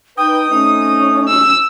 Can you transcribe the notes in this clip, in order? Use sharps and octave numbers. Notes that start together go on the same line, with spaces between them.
D#4 B4 G5 D#6
A3 C4 C#4 D#4
E6